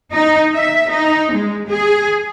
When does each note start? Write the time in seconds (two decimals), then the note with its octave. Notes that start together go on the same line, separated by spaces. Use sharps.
0.13 D#4
0.55 E5
0.90 D#4
1.32 G#3
1.68 G#4